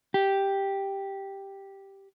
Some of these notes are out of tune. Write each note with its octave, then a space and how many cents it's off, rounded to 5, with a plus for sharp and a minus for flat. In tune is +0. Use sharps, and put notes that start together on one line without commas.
G4 +0